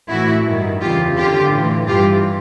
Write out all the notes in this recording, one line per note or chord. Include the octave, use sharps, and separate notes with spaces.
A2 E3 E4 F#4
G2 D#3
E2 C#3 E3 F4 G4
F#2 D3 F4 G4
A2 E3
G2 E3 F4 G4